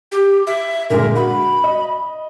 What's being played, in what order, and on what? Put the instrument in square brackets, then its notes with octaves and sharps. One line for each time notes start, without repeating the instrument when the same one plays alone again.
[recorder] G4
E5
[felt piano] A#2 D3 G#3 [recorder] A#4
[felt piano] F#4 [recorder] B5
[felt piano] D#5